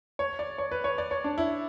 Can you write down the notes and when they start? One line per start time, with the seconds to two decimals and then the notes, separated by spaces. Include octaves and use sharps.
0.19 C#5
0.39 D5
0.58 C#5
0.71 B4
0.84 C#5
0.98 D5
1.11 C#5
1.24 D4
1.38 E4